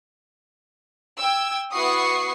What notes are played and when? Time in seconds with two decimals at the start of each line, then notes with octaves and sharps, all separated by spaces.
1.19 G5 E6 G#6
1.73 B3 E4 F#4 C#6 D#6 C7